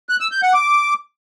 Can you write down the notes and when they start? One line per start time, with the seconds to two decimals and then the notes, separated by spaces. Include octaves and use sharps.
0.09 F#6
0.20 E6
0.31 G6
0.43 F#5
0.54 D6